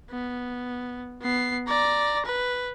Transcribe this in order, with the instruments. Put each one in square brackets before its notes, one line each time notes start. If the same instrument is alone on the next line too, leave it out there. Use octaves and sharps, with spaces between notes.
[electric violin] B3
B3 C7
D5 A#5
B4